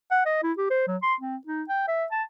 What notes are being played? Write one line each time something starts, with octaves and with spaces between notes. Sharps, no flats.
F#5
D#5
E4
G4
C5
F#3
C6
C4
D#4
G5
E5
A5